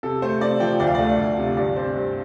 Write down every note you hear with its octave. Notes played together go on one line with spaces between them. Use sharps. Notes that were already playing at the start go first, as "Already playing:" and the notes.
C3 A4
A3 C5
C3 D5
F3 G5
D2 D5
F5
A3 D5
D2
C3
G2 D5
C4 C5
G2